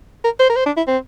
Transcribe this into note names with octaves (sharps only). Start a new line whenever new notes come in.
A#4
C5
A#4
C5
D4
E4
C4